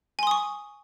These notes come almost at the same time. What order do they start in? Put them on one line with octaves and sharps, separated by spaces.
G#5 C6 D#6 C#6